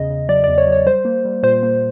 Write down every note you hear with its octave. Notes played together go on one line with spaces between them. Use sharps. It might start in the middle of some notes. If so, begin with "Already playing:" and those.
Already playing: E2 C#3 D#5
C#3
F#3 D5
E2 D5
C#5
F#3
C#5
G3 C5
A#3
G3
A#2 C5
A#3